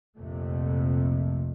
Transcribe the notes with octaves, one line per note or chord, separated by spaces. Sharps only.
A#1 F2 C3 A3